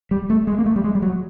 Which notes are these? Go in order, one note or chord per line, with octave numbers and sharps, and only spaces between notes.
G3
A3
G#3
A#3
A3
G3
G#3
G3
F#3